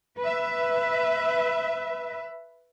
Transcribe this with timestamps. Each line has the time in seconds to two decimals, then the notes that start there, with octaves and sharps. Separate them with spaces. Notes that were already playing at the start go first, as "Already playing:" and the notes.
0.19 B4 E5